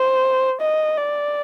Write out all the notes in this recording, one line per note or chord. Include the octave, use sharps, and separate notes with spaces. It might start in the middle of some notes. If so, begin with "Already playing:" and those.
Already playing: C5
D#5
D5